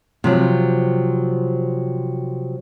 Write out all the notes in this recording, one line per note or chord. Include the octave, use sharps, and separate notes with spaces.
C3 F3 F#3